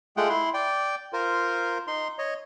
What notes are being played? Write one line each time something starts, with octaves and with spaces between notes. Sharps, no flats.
G#3 A3 F4 G#4 F#5 G5
E4 C6
D5 G5
F4 A#4 C5
D#4 C6
C#5 D#5